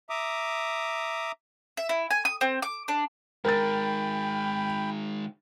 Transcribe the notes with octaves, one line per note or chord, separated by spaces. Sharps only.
E5 A#5 D6 D#6
E5
E4
G#5
D#6
C4
D6
D4
D#3 G#3 A#4 G5 B5 A6